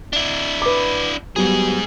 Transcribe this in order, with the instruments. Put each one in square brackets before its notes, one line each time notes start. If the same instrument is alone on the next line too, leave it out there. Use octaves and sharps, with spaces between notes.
[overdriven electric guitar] D4 E4
[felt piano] B4 D6
[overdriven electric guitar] G#2 G#4 [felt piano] F#3 G3 B3